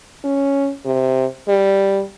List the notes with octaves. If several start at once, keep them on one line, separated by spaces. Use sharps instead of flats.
C#4
C3
G3